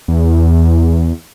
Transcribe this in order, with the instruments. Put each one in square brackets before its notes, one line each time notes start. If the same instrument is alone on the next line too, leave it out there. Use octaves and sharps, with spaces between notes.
[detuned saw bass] E2